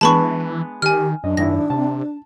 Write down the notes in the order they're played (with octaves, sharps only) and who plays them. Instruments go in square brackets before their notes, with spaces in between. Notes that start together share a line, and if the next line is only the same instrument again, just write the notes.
[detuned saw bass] E3 [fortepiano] G#3 B3 D4 [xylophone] A5 B5 C#6
[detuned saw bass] D#3 [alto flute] G4 [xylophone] G#5 F6
[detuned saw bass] F#2 [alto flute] D4 [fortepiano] D#5
[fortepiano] G#1 E4 [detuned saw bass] F#2 [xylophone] A#6
[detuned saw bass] C3 [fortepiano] A5